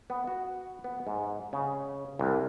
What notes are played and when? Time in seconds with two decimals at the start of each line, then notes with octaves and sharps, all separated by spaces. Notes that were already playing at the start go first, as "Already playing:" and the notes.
0.10 B3
0.27 F#4
0.84 B3
1.07 G#2
1.53 C#3
2.19 C2